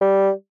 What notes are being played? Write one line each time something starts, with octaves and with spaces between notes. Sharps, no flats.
G3